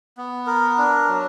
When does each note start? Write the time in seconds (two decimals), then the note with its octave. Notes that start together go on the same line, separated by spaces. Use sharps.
0.17 B3
0.47 A#4
0.78 D4
1.08 F#3